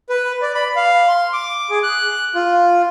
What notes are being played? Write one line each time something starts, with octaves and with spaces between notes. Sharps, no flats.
B4
D5
B5
F5
C6
D6
G#4
F#6
F4